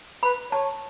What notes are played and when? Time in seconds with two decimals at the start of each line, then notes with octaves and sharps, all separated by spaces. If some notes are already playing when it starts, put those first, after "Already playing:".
0.23 B4 B5
0.52 C#5 A5